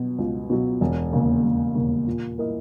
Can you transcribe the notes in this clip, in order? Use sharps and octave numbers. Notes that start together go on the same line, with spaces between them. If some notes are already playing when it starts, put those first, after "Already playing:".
Already playing: B2 F#3
C#2
B2 F#3
E1
D#2 C#3
E1
D#2 C#3
A#2
A#3 E4 A#4 D#5